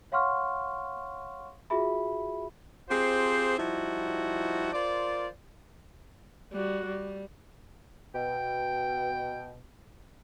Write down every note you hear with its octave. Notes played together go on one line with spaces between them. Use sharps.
C#5 F5 F#5 C6 C#6 F6
F4 F#4 G#4 E5 B5
C4 F4 G4 G#4 C5
F3 G3 D#4 E4 F#4
F4 A#4 C5 D5
G3 F#4
G3
B2 G5